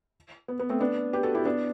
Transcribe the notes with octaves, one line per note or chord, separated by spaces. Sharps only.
B3
B3
A3 C4
B3 D4
G4 B4
F#4 A4
E4 G4
B3 D4